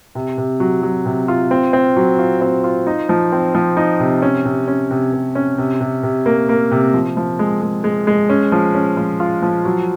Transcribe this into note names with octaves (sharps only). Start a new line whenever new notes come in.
C3
C3
F#3
F#3
C3
F4
C4
C4
F#3
F4
C4
F4
D#4
F3
C4
F3
D#4
C3
C#4
C3
C#4
C3
C3
C#4
C3
C3
C3
A#3
A#3
C3
F3
F3
G#3
G#3
G#3
G#3
C#4
F3
C#4
F3
F4
F3
F#3